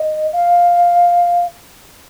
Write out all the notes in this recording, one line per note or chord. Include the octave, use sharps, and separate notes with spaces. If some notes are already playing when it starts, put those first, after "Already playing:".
Already playing: D#5
F5